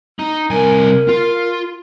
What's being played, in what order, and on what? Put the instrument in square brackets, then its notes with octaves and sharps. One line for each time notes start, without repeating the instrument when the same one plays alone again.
[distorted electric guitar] D#4
[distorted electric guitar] C2 G#5 [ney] A#4
[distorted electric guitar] F4